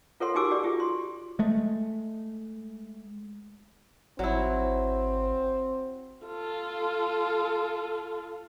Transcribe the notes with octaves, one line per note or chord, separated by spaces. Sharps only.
F4 A4 A#4 C#5 F#5 C6
D#4 F#4 G4 G#5 D6 E6
F#4 G4 D5
F4 G4 G#4
C6
G#3 A3
G#1 F#3 C4 E4
F4 A4